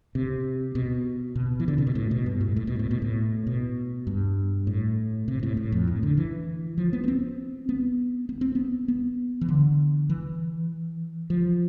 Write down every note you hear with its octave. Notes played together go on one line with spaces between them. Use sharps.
C3
B2
B2
E3
D3
C3
B2
A2
B2
G2
A2
A2
B2
A2
B2
A2
B2
G2
A2
C3
A2
A2
F2
A2
D3
E3
F3
B3
B3
C4
B3
B3
C4
B3
B3
E3
D3
E3
F3